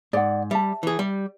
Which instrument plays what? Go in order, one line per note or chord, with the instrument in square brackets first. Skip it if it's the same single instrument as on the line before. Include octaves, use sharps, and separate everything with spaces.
[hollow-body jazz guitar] G#2 [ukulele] D5 F#5
[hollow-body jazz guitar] G3 [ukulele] E5 A5
[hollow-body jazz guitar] E3 G#4
G3